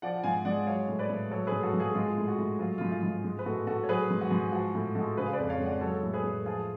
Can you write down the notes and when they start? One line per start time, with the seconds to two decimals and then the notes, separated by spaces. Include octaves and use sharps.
0.02 F3 D5 F#5
0.18 F#5
0.23 G#2 F5 G#5
0.45 G#3 D5 F#5
0.67 F#3 C#5 F5
0.89 A2
0.99 B4 D5
1.10 A2
1.31 F#3 A4 C#5
1.47 G#4 B4
1.52 G#2
1.63 F#4 A4
1.73 G#2
1.79 F4 G#4
1.95 G#3 F4 G#4
2.17 A2
2.28 F#4
2.39 A2
2.59 F#3 F4
2.78 G#2 F4
2.92 F4
3.03 G#2
3.24 G#3
3.39 B4
3.46 A2 F#4 A4
3.67 A2 F#4 A4
3.84 C#5
3.88 F#3 G#4 B4
4.11 G#2
4.21 F#4
4.31 G#2
4.52 F3 F#4
4.75 A2
4.95 G#3 F#4 A4
5.17 C#3 G#4 B4
5.26 F5
5.33 B4 D5
5.38 F2
5.49 C#5 F5
5.60 G#3
5.65 D5 F#5
5.81 F#3 A4 C#5
6.03 A2
6.13 G#4 B4
6.24 A2
6.46 F3 F4 G#4